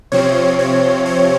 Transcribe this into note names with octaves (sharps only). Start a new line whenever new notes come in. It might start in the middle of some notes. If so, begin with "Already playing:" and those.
C3 F3 C4 C#5
C#5
C#5